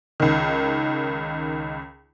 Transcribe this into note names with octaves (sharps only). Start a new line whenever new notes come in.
C#2 D#3